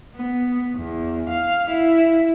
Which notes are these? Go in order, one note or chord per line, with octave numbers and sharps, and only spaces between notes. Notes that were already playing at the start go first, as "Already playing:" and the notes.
B3
E2
F5
E4